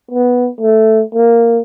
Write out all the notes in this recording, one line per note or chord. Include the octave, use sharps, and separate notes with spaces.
B3
A3
A#3